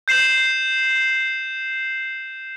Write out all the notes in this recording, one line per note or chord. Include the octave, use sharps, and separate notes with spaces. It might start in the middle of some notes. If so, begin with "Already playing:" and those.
G6 C7 E7 F#7